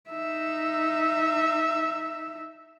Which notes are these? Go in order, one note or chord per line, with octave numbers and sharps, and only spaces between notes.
D#4 E5